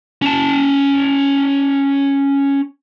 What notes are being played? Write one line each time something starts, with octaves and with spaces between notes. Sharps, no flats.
C#4 A5